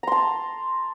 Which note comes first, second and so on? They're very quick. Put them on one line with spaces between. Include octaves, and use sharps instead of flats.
A#5 C6 A5